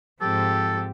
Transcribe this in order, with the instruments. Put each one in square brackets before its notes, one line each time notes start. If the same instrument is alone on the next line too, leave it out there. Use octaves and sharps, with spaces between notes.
[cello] G#2 F3 [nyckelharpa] C4 G4 [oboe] A4